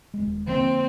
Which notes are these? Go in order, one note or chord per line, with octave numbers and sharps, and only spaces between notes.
D#1 G#3
D3 F3 A#3 C4